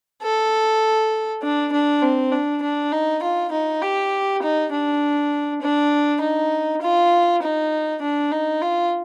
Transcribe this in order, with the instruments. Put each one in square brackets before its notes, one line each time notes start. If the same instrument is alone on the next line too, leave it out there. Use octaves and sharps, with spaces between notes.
[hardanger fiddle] A4
D4
D4
C4
D4
D4
D#4
F4
D#4
G4
D#4
D4
D4
D#4
F4
D#4
D4
D#4
F4